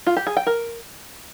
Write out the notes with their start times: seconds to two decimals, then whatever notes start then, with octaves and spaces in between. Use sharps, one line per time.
0.06 F4
0.17 G4
0.27 G#4
0.37 G5
0.47 A#4